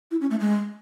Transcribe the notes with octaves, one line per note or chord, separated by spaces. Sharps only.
E4
C#4
A3
G#3